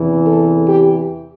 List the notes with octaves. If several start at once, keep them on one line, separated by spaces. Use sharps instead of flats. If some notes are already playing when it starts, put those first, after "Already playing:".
Already playing: E2 C3 E3
A4
G4